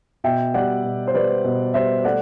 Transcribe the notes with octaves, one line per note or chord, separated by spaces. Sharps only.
B2 E5 G5
G3 D5 F#5
B2
C5
G3 B4 D5
B2
G3 C5 E5
A3 D5 F#5